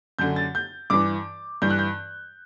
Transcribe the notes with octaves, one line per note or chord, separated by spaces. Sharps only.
F#2 D3 G6
A6
G6
G2 E3 D6
G2 E3 G6
F#6
G6